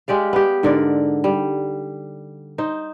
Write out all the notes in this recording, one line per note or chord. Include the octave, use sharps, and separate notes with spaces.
G#3 G4 D5 F5
B3 G4
G#2 D3 A#4 D5
G3
D#4 C5